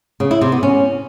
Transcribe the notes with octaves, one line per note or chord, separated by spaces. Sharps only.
C#3
E4
C3
B3
C#4